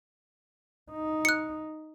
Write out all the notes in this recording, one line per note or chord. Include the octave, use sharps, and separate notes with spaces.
D#4
F#6 C#7